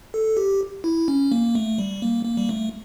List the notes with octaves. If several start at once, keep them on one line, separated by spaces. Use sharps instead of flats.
A4
G4
E4
C#4
A#3
A3
G3
A#3
A#3
G3
A3